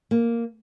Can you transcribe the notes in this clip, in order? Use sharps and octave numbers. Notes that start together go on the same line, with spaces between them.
A#3